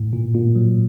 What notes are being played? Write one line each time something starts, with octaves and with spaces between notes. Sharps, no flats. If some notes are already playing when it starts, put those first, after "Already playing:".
Already playing: A2
A#2
A#2
F#3